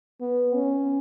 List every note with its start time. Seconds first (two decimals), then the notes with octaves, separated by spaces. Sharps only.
0.21 B3
0.54 C#4